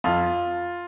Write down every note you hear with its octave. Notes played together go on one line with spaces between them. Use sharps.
F2 F4